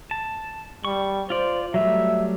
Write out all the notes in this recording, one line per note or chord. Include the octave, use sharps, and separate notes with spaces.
A5
G3 C#6
F4 C5 D5
F#3 G3 A3 E5